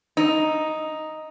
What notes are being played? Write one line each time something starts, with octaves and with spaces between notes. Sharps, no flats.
D#4